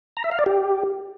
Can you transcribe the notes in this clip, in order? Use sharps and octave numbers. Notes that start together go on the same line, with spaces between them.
A#5
E5
F5
D5
G4